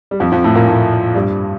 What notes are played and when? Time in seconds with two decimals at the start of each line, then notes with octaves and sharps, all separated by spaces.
0.11 G3
0.20 F2 F3
0.32 F2 F3
0.44 A2 A3
0.55 A#2 A#3
0.68 A2 A3
1.15 G2 G3